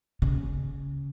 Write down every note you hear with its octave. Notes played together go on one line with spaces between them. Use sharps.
C#3